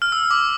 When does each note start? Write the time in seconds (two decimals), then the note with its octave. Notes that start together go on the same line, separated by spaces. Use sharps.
0.02 F6
0.12 E6
0.31 D6